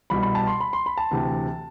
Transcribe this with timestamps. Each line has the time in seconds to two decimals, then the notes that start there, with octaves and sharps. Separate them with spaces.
0.10 C2 B2 B5
0.23 B5
0.35 A5
0.47 C6
0.60 B5
0.73 C6
0.86 B5
0.97 A5
1.11 D2 C3 E3